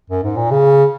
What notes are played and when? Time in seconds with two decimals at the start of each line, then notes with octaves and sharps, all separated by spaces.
0.10 F#2
0.23 G#2
0.36 A#2
0.50 C#3